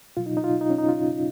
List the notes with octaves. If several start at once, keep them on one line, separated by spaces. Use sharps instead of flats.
B2 F#3 F4
D#4
D#4
F4
D#4
C#4
D#4
F4